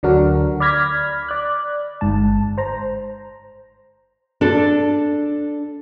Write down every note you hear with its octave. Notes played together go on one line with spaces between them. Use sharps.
D2 D3 F#3 D4 F#4 A#4
D5 B5 F6 G#6 A#6 B6
D5 F#6
G1 G#2 A5
C5 A#5
D4 A4